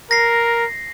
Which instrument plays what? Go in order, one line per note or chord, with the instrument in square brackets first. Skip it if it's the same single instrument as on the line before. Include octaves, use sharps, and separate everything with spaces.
[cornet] A#4 [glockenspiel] A#6 C7